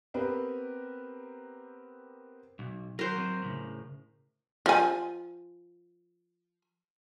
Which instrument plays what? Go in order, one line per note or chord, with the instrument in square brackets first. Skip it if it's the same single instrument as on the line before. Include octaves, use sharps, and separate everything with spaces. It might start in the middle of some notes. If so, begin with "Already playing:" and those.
[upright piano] B3 C4 G4 A#4 B4
[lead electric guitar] B1
[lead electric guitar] F#3 [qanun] A#4 C5
[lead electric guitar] F#3 C4
A2 C#3
[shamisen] F3 G#5